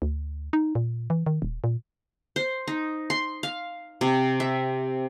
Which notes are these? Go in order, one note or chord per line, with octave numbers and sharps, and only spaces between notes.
D2
D#4
A#2
E3
D#3
D#1
A#2
C5
D#4
C6
F5
C3
E5